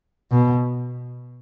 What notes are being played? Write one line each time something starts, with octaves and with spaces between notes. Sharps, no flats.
B2